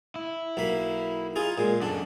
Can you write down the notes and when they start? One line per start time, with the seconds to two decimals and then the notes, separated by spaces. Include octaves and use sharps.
0.16 E4
0.57 B1 A#3 B5
1.36 D#4 F4 G#4
1.58 A#2 G#3
1.82 F#2 D4 A4